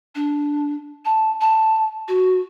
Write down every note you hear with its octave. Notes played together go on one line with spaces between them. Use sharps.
D4
A5
A5
F#4